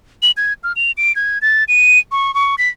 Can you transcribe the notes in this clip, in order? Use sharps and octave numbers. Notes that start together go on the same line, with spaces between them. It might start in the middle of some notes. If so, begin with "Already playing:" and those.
F#7
G#6
F6
F7
D7
G#6
A6
D#7
C#6
C#6
B6